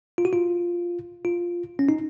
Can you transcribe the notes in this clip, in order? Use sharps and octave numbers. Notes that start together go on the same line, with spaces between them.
F4
F#4
F4
F4
C#4
D#4